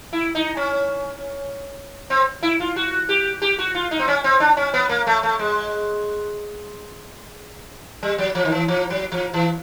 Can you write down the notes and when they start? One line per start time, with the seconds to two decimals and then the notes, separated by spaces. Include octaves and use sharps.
0.13 E4
0.35 D#4
0.57 C#4
2.10 C4
2.43 E4
2.60 F4
2.76 F#4
3.09 G4
3.42 G4
3.59 F#4
3.75 F4
3.91 D#4
3.99 C4
4.08 C#4
4.24 C4
4.40 D4
4.57 C#4
4.74 B3
4.89 A#3
5.07 A3
5.23 A3
5.39 G#3
8.03 G3
8.18 F#3
8.35 F3
8.45 D#3
8.52 E3
8.68 F3
8.90 F#3
9.12 F3
9.34 E3